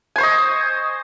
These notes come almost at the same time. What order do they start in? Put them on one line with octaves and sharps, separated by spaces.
G#5 C5 C#6 D#5